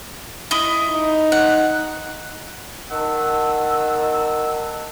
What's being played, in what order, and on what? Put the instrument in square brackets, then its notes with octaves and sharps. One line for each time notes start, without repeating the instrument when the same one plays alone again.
[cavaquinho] E4 D#5 D#6
[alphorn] D#4
[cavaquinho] F#5
[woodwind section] D#3 F#5 A5 E6